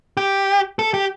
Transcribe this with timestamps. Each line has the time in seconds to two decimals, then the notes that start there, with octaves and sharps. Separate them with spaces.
0.17 G4
0.79 A4
0.94 G4